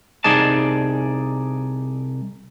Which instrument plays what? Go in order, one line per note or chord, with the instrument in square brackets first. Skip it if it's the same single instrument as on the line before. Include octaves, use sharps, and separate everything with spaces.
[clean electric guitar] C2 D#4 G#4 D5 A5